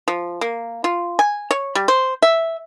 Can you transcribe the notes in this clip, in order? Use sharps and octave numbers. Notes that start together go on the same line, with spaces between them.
F3
A#3
F4
G#5
C#5
G3
C5
E5